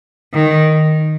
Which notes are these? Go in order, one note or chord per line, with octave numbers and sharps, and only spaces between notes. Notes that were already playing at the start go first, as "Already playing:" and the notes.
D#3